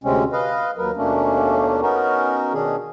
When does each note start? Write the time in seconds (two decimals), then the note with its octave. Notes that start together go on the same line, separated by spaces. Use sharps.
0.04 D2 C3 G#3 C4 C#4
0.32 B4 D#5 F5
0.77 D#2 F#3 A#4 B4
0.97 D#2 B2 A3 A#3 C#4 D4
1.82 B3 C#4 D#4 F#4 A#4
2.53 B2 D#3 C#4 D4 G#4